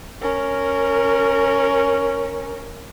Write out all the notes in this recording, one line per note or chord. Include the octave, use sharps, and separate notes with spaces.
C#4 A#4